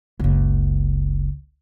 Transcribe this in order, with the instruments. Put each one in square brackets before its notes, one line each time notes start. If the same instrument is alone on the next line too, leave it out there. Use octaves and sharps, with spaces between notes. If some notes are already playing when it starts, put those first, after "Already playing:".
[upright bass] F#1 C#2